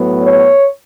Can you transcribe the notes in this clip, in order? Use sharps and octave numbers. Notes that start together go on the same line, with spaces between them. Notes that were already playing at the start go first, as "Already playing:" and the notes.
Already playing: A2 F#3 B3
C#5